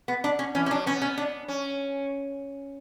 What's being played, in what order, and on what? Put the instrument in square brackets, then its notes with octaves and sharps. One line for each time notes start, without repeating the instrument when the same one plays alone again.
[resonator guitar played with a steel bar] B3
D4
C#4
[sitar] E3 [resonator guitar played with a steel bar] C#4
[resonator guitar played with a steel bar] C#4
[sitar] F#3 [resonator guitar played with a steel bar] D4
[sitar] B3 [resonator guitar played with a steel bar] C#4
[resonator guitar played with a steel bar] C#4
D4
[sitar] C#4